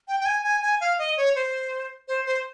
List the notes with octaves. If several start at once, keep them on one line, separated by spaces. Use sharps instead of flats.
G5
G5
G#5
G#5
G#5
F5
D#5
C#5
C5
C5
C5